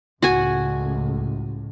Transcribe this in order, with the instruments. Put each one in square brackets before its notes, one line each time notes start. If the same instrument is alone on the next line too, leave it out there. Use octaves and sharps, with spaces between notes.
[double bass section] C#2 A2 [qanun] F#4 G#5